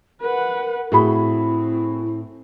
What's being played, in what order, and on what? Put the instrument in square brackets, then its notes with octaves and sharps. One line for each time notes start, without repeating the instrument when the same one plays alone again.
[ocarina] A#4 [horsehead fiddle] B4 F#5
[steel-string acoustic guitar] A2 [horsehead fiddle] C4 [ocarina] E4 [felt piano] F#4 G#4 B5